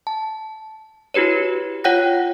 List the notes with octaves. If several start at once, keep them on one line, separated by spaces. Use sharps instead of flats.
A5
E4 F#4 G4 B4 C#5
F4 C#5 F#5 G5 F#6 A#6